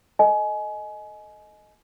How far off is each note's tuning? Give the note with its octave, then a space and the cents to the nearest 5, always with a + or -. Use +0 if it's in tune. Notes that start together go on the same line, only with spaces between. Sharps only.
A4 +0 D#5 +0 G#5 +25